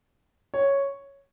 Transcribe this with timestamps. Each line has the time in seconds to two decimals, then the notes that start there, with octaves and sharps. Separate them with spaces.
0.54 C#5